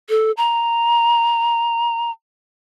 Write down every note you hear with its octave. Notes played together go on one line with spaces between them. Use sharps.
A4
A#5